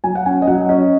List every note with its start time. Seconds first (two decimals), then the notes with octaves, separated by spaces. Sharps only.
0.04 F#3 G#5
0.15 F#5
0.26 C#4 G#5
0.42 D#5
0.47 F#3 F#5
0.69 C#4 D#5